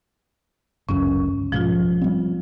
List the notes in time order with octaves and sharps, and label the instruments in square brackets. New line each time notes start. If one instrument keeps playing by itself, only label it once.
[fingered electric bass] G1 C#2 F#2 [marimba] C#4
[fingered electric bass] B1 G#2 [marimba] F3 F4
[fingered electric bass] G3 C4